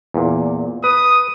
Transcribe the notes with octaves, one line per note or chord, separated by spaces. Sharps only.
E2 A#2
B4 D#6